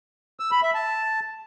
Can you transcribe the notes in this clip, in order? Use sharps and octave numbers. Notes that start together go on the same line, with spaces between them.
E6
B5
E5
A5